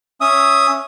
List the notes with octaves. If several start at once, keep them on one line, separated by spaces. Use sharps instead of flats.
C#4 E5 D#6